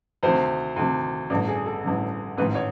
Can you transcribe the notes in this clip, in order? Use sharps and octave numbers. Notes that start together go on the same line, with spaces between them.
D2 C3 D#3 C5
D2 C3 D#3
A1 G2 D3 D5
G#4
A4
A1 G2 D3
A1 G#2 D#3 B4
C#5